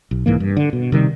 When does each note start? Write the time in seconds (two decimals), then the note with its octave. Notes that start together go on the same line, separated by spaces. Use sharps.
0.11 B1
0.26 C2 G#2 E3 A#3
0.40 G2
0.57 D3
0.73 B2
0.92 C3 D#3 G3